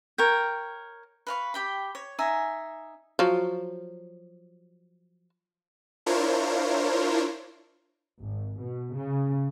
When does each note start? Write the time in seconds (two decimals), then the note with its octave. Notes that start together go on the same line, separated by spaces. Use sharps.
0.18 A#4 C#5 G5
1.27 B4 F5 C#6
1.54 G4 G5 B5
1.95 C#5
2.19 D#4 E5 G#5
3.19 F3 F#3
6.06 D4 E4 F4 A#4 C5 C#5
8.19 G#1
8.61 B2
8.96 C#3